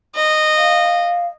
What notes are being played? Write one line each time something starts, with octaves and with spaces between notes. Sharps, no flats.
D#5
F5